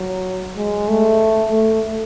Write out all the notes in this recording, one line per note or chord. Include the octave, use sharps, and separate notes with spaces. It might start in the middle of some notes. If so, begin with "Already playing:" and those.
Already playing: F#3
G#3
A3
A3